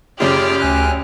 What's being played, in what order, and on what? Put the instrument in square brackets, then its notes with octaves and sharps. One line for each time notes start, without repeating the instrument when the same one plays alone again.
[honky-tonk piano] F#2 C#3 [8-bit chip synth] F4 G#4 D5 [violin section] G4 F6
[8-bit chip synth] D2 G#5 F#6